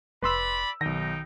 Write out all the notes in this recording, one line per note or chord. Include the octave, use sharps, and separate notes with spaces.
F1 B4 D5 B5 C6 E6
B1 D#3 D#4 G5 A#6